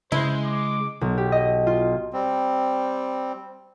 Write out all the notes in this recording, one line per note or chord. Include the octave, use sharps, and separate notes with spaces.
C#3 G#3 E4 C5
D6
B1
G4
D#5
F4
G3 C4